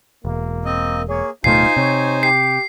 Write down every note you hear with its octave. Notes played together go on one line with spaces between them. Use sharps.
E1 A#3
C4 D#5
A#3 G#4 C#5
D1 B2 A3 D#4 F4 C5 G#5 C7
C3 C#5
G4 C7